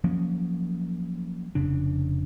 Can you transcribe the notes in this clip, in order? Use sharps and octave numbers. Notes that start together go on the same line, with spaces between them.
F3 F#3 A#3 C#4
F1 C#3 D4